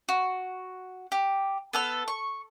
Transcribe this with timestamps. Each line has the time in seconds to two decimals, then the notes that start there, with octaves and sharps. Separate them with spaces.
0.09 F#4
1.12 G4
1.73 B3 A4 F6
2.08 C#6